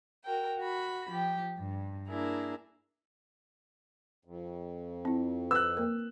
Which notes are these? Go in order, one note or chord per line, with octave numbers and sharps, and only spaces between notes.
F#4 A#4 G5
F#4 B5
F3 G4
G2
A#3 D4 E4 G#4 A#4
F2
C4 E4
B4 E6 F#6
A#3 A#4